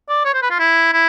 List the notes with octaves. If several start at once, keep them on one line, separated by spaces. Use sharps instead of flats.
D5
C#5
C5
B4
F4
E4
E4